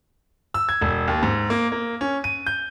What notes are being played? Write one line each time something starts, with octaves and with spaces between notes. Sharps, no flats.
E6
G#6
E1
D#2
G#2
A#3
A#3
C#4
D#7
G6